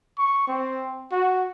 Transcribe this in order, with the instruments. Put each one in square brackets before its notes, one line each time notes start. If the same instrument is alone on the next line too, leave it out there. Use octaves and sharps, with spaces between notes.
[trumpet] C#6
C4
F#4